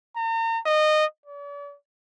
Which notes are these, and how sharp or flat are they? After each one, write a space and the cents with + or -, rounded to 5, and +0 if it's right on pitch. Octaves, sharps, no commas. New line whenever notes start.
A#5 -40
D#5 -20
D5 -45